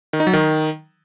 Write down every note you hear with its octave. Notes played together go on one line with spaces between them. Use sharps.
D#3
D#4
F#3
D#3